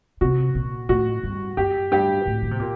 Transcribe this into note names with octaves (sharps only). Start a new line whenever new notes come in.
C3 F#4
A#2
A2 F#4
G2
F#2 G4
G2 G4
A2
D3
C3
A#2